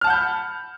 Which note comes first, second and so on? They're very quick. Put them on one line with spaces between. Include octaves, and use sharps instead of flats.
F6 A5 F#5 G6 B5